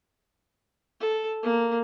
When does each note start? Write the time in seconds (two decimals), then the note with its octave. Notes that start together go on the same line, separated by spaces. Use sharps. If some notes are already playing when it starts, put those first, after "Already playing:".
1.00 A4
1.43 A#3